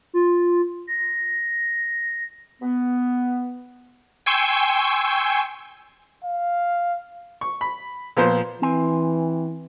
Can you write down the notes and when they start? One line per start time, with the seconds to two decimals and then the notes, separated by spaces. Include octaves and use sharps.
0.14 F4
0.87 A#6
2.63 B3
4.26 G5 G#5 C6 C#6 E6
6.24 F5
7.41 C#6
7.61 B5
8.17 A#2 F3 B3 C5
8.62 E3 C4 G#5